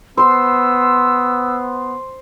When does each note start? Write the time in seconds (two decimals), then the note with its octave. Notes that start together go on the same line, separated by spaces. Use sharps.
0.17 B3 C5 C6 E6